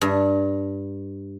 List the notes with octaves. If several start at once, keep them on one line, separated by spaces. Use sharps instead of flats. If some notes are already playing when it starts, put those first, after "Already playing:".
G2